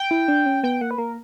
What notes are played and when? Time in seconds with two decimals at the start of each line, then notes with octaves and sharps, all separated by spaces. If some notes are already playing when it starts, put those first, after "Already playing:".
Already playing: G5
0.11 E4
0.28 D4
0.46 C#4
0.63 B3 G5
0.81 A#3 F#5
0.91 B4
0.98 A#3 A#4